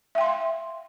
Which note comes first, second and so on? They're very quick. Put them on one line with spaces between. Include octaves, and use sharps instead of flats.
E5 G5 C6 F5